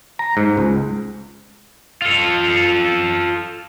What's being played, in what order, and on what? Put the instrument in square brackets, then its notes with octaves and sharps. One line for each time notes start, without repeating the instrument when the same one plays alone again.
[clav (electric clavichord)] A#5
G#2
C#2
[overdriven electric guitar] F4 A4